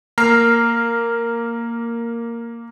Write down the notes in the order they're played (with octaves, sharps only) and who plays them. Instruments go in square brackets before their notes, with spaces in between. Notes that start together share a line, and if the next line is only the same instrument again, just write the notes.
[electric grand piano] A#3 A#5 F6 C7